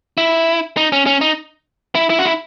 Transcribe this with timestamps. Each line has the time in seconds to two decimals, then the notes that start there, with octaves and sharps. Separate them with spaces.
0.18 E4
0.77 D#4
0.92 C#4
1.06 C#4
1.21 D#4
1.95 E4
2.10 E4
2.19 F#4
2.25 E4